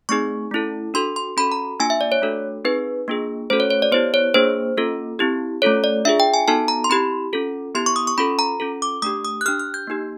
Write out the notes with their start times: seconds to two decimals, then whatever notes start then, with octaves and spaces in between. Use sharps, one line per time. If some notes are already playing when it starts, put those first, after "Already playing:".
0.09 A3 C4 D#4 G#4 C#6
0.51 A3 C#4 E4 A4
0.94 D4 F#4 A4 C6
1.16 C6
1.37 C#4 F#4 A4 B5
1.52 A#5
1.79 A#3 D4 F4 G#5
1.90 E5
2.01 D5
2.12 C#5
2.22 A3 D4 F#4 A4
2.65 C4 D#4 G#4 B4
3.08 A#3 D4 F4 G#4
3.50 A3 C#4 F#4 A4 C5
3.60 C#5
3.70 C#5
3.82 D5
3.92 B3 E4 G4 C5
4.14 C#5
4.34 A#3 D4 F4 G#4 C5
4.77 A#3 C#4 F4 A4
5.19 C4 E4 G4
5.62 A3 C#4 F4 A4 C#5
5.84 D5
6.05 D4 F4 G#4 E5
6.20 G5
6.34 G#5
6.48 B3 D#4 F#4 A4 A5
6.68 A#5
6.84 C6
6.90 C4 E4 G4 B5
7.33 C#4 F4 A4
7.75 B3 E4 G4 C6
7.86 C#6
7.96 D#6
8.07 C#6
8.18 C#4 F4 A4 B5
8.39 A#5
8.60 C#4 F4 A4
8.82 D6
9.02 A3 D4 G4 D#6
9.25 D#6
9.41 F#6
9.46 D4 G4 F6
9.59 F6
9.74 G6
9.87 A#3 D#4 G4